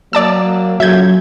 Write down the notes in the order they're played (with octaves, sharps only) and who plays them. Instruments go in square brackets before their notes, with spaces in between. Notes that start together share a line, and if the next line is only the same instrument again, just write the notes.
[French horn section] F#3 A#3 [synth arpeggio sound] D5 A5 E6
[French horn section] A#2 C#3 A4 [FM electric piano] F#3 [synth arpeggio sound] E5 G6 G#6